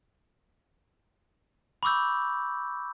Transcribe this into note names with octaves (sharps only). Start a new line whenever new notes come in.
B5 C#6 D6 E6 G6